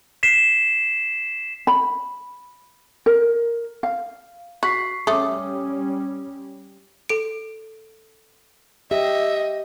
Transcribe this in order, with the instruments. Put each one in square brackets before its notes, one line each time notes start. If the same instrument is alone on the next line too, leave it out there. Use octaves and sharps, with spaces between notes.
[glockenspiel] B6 C7 E7
[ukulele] B5
A#4
F5
[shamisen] F#4 [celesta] C#6 B6 C7
[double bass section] G3 C#4 [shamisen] A3 [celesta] D6 D#6
[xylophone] A4 D7
[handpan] G4 [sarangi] D#5 [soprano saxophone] E5